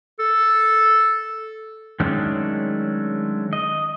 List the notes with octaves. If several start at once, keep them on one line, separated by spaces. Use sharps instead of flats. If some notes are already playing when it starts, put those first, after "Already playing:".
A4
D#3 F#3 G#3 A3 C#4 D4
D#5